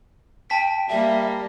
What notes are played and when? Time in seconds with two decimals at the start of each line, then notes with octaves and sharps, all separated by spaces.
0.50 G5 A5 B6
0.89 G3 A#3 E5